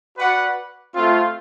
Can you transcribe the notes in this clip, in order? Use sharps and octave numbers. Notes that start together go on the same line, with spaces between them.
F#4 B4 D5 F#5
A3 C4 F4